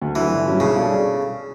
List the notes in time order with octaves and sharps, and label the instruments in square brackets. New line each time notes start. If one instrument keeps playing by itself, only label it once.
[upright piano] D2
[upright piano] D3 F#3 [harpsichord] E3
[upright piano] G1
G2 F#3 C#4
[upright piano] B1 [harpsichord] C#3
[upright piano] B2 G3 D4 A4